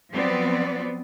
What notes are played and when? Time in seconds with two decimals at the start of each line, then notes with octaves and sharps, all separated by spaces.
0.12 F3 F#3 B3 C4 D5